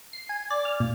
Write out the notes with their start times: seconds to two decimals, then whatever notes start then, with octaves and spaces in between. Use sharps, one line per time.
0.13 C7
0.29 G#5
0.50 D5
0.65 F6
0.80 A#2